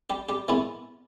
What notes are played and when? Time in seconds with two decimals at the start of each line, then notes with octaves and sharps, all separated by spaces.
0.10 G3 G4
0.29 G3 G4
0.48 A#2 E3 G#3 B3 E4